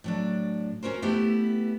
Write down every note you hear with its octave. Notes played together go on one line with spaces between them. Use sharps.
A2 F#3 D4
C#4 F#4 A#4 C5
A3 B3 E4 G4